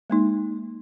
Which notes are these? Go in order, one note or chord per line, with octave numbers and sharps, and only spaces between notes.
G#3 A#3 D#4